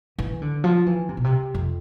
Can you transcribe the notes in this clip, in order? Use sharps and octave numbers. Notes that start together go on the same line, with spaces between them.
E3
D3
F3
E3
C3
B2
C3
F2